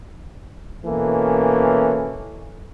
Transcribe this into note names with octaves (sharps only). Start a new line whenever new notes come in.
B2 E3 A#3 C#4 A4